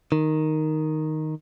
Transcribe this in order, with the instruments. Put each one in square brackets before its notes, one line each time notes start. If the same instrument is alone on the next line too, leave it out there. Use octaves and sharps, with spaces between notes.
[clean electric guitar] D#3